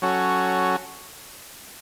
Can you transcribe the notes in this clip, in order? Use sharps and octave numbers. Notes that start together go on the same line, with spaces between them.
F#3 C#4 F#4 A4